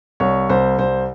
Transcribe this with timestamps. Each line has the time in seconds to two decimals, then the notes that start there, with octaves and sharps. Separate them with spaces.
0.20 C2 C#5
0.49 C2 C5
0.79 C2 C5